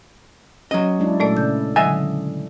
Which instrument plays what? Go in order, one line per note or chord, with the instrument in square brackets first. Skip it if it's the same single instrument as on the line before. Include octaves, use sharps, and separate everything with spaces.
[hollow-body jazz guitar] F#3 D#5 [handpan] C#4
[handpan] G#3 D4 E4
[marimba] A#2 A3 D5 [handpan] A4
[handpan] C#3 [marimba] G6
[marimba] D3 D#3 F#3 [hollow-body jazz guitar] D#5 E5 G#5